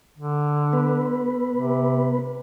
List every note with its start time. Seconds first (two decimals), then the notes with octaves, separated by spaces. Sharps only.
0.18 D3
0.73 B3 B4
1.53 C3